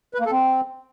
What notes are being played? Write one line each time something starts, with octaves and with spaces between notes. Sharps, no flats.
B4
A#3
A4
C4